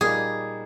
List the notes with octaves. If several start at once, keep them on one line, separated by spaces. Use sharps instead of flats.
A#2 G3 A#3 D#4 G#4